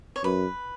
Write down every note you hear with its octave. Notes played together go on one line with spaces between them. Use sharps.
C#5
F#2 B4